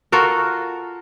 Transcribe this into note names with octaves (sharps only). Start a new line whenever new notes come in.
F4 F#4 A4 A#4